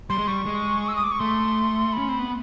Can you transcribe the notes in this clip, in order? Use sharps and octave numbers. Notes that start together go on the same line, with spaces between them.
G3 C6
G#3
G3 C#6
G#3
E6
D#6
D6
C#6
A3 C6
C#4 B5
C4
B3